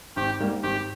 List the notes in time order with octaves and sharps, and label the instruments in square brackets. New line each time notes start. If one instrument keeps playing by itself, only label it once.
[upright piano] G#1 [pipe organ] G4
[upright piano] G#2 G3 A#3
[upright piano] G#1 [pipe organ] G4